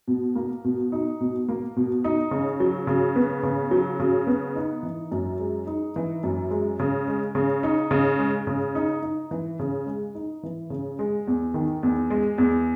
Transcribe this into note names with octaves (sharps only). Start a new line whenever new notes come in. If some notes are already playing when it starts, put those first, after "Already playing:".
B2
A#3
B2
D#4
B2
A#3
B2
D#4
C#3
F#3
C#3
B3
C#3
F#3
C#3
B3
D#4
E3
F#2
G#3
D#4
E3
F#2
G#3
C#3
G#3
C#3
D#4
C#3
G#3
C#3
D#4
D#4
E3
C#3
G#3
D#4
E3
C#3
G#3
E2
D#3
E2
G#3
E2